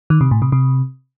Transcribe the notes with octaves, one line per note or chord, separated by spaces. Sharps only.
D#3
C3
A2
C3
C3